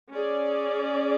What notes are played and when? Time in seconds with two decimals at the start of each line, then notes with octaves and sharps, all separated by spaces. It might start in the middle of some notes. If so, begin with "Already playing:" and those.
0.12 C#4 G#4 D5